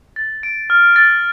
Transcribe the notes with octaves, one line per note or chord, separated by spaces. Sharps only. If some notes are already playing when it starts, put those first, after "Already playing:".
A6
D7
F6
A6